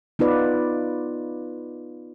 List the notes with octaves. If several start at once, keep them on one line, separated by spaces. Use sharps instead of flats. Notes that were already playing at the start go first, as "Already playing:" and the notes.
B3 D#4 F4 B4 D5